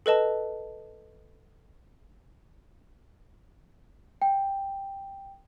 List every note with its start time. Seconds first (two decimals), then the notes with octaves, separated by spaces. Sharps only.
0.06 A4 B4 D#5 A5
4.22 G5